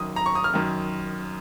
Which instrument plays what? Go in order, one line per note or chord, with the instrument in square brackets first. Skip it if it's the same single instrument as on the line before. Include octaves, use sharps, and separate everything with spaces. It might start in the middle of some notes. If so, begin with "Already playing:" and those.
Already playing: [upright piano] F#2 D#3 D#6
A#5
C#6
D#6
F6
F#2 D#3